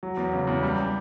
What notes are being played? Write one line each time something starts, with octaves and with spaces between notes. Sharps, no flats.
F#3
E2
C#3
E2
G3